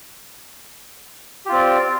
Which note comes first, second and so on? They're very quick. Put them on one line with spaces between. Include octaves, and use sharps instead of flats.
G4 F4 C4 D5